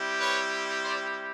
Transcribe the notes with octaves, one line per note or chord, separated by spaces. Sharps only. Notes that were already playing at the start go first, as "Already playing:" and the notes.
Already playing: G3 C4 E4 G4
B4 C#5
C5 D5